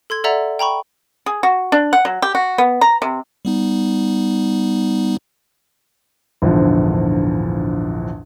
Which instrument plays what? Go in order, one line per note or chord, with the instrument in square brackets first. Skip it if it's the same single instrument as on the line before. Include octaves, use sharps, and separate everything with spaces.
[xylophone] A4 C6 G#6
A4 D5 E5 F#5 A#5
G5 A#5 B5 C#6
[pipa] G#4
F#4
D4
F#5
F#3
G4
F#4
B3
A#5
C3
[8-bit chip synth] G3 B3 D#4
[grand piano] A#1 E2 G#2 D3 F3